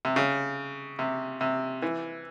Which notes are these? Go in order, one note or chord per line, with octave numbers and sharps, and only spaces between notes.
C3
C#3
C3
C3
E3